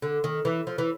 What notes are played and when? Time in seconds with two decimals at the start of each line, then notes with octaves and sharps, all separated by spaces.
0.02 D3
0.24 D#3
0.45 E3
0.67 F3
0.78 E3